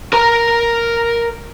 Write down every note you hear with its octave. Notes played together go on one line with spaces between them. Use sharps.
A#4 A#5